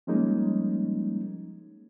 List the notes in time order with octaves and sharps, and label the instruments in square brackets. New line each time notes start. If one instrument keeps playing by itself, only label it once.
[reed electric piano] F3 G3 G#3 A#3 C#4 D#4